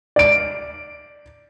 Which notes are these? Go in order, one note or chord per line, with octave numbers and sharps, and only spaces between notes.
D5 D7